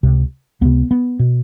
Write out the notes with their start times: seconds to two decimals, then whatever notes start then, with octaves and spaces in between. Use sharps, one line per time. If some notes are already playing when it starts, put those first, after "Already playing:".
0.03 C#2 C3
0.61 C#2 C3 B3
0.91 B3
1.19 B2